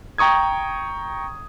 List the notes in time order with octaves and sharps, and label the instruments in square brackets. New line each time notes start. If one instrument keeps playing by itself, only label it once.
[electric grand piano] G5 A#5 C#6 D#6 G#6